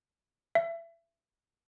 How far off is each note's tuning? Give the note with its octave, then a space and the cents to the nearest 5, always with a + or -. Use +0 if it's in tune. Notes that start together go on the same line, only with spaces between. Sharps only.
E5 +25